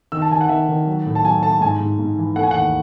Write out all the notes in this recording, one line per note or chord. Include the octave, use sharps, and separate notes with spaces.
D#3 E6
A5
D#3 G#5
F#5
D#3 E5
D#3
F#3
A2
A5
F#3 G#5
A3 A5
G#2 G#5
G#2
G#2
E3
A3 F#5
G#5
D#2 F#5